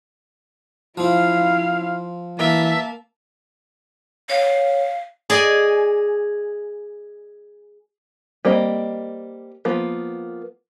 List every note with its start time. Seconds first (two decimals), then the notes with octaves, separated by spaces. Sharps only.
0.98 F3 C4 E4 F5
2.39 E3 A#3 E5 A5
4.30 C#5 F5
5.30 G#4 D5 D#5 G#5
8.45 G3 A#3 C4 D#5
9.65 F3 A#3 B3